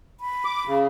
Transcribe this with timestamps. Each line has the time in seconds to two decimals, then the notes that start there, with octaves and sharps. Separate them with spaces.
0.20 B5
0.45 D6
0.68 C#3